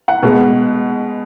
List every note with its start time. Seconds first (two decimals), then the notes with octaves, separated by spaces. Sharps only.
0.08 F#5
0.23 B2 G#3 B3